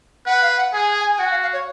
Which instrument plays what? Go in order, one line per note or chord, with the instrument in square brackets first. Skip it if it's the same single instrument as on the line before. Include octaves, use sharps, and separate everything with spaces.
[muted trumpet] B4 [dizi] F#5
[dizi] F5
F#5
[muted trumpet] G#4 [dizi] G#5
[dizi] G#5
G#5
[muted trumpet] F#4 [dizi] F#5
[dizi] F5
F5
C#5